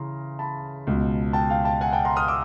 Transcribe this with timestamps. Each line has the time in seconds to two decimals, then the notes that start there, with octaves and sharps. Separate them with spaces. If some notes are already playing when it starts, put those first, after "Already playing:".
Already playing: C#3 E3 A#5 C6
0.39 A5 B5
0.87 C#2 B2
1.33 G5 A5
1.50 F5 G5
1.65 G5 A5
1.81 F#5 G#5
1.92 G5 A5
2.05 A#5 C6
2.16 D#6 F6
2.28 D6 E6